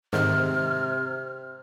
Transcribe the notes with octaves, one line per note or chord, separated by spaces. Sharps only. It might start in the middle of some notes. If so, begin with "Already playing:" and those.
G#2 C3 D#3 C4 F6